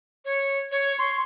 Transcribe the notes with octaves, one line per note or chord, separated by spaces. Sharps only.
C#5
C#5
C6 C#6